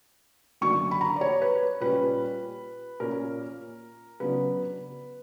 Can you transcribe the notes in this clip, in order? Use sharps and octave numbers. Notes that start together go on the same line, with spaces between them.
F#2 D3 A#3 D4 C#6
B5
A#5
D5
C#5
B4
A#2 G3 C#4 B4
A#2 A#3 C#4 A#4
C#3 F#3 B3 D4 B4